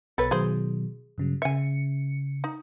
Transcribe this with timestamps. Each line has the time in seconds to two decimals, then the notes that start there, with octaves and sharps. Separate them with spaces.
0.18 B1 B2 A4 B4 C#5 A6
0.31 B2 D#3 F#3 G#4 C5
1.18 G2 C#3 F#3
1.42 C#3 E5 G#5 C#7
2.44 D#4